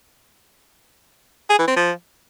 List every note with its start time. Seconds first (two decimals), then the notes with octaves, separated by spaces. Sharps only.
1.49 G#4
1.58 E3
1.67 C4
1.76 F3